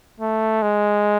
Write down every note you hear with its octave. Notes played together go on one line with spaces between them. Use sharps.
A3
G#3